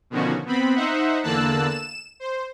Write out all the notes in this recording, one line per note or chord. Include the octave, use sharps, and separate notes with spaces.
B2 D3 D#3 F3 C#4 F#4
B3 C4 B5
D#4 C5 E5 F#5
E2 D3 A#3 A5 E6 F#6
E7
C5